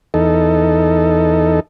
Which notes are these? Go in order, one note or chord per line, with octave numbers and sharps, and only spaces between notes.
E2 D#4 A4